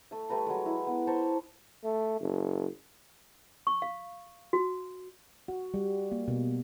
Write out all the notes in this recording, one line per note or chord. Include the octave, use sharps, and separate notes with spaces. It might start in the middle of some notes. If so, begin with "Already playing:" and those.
A3 E5
G3 A3 B4 A#5
F#3 G#3
E4
B3
C5 A5 A#5 C#6
A3
F#1
C#6
F5
F#4
F#4
G3
A#3
B2